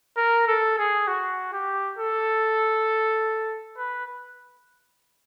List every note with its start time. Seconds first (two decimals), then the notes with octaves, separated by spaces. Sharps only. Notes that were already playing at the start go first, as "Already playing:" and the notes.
0.17 A#4
0.47 A4
0.78 G#4
1.07 F#4
1.52 G4
1.98 A4
3.78 B4